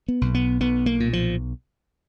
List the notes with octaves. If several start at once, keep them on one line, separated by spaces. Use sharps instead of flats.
B3
B1
B3
B1 B3
A#3
A#2
F3